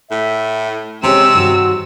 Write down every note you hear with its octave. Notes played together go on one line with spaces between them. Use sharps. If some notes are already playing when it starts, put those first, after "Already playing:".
A2 E5
C3 G#3 C4 C#4 G4 G#4 E6
G2 D#3 F#4